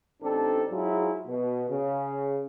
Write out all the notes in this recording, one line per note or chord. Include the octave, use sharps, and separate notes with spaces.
A1 C4 D4 D#4 A4
G#2 F#3 E4 F4 G#4
B2
C#3